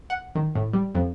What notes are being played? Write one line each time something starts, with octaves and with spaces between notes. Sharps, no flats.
F#5
D#3
A2
G3
F2